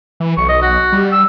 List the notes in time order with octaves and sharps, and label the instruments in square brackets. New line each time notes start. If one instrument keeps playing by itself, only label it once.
[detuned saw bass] E3
[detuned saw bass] B1 [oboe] C#6
[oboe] D#5
F#4
[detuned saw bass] G3
[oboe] E6